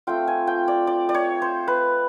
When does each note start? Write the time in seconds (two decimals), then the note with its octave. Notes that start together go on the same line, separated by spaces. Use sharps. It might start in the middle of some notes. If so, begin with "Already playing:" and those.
0.07 A3 C4 F4 G5
0.27 G#5
0.47 G5
0.68 D5
0.87 D5
1.09 D5
1.14 C#5
1.42 C5
1.68 B4